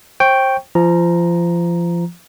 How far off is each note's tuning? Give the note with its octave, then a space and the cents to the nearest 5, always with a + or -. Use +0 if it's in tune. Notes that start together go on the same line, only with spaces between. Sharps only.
C5 +30 G5 +0 C#6 +0
F3 -25 A#5 +0